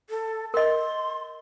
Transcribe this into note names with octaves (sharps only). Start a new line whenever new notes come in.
A4
A#4 D#5 C6